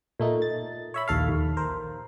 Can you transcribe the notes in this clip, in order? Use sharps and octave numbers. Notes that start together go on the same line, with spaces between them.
A#2 A3 D#4
A6
C#5 E5 B5
A#1 D#2 A4 F5
D#2
A#4 C5